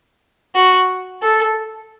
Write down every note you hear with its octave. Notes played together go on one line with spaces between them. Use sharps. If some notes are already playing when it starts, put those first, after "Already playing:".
F#4
A4